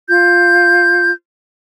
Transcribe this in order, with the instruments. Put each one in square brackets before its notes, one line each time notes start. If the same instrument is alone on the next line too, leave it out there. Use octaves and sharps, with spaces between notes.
[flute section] F4 G6